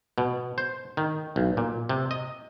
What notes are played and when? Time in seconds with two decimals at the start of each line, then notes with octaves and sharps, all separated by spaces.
0.18 B2
0.58 C5
0.97 D#3
1.36 B1
1.57 A#2
1.89 C3
2.11 D#5